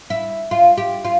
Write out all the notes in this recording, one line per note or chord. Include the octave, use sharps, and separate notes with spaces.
E4
F4
G4
F4